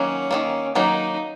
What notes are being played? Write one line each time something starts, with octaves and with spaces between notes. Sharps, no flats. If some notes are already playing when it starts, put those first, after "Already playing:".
Already playing: D#3 F#3 A#3 C#4
D#3 F#3 A#3
D#3 F#3 A#3 D#4